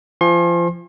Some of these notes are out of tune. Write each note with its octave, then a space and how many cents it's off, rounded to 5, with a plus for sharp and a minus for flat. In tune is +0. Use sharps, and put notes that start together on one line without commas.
F3 -30 G#5 -35 C6 +40